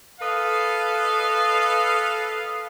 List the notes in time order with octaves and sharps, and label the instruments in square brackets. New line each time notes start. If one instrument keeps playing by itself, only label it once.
[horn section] A4 B4 D#5 F5